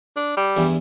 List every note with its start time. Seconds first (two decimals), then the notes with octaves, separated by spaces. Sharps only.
0.16 D4
0.37 G3
0.57 E2 G2 E3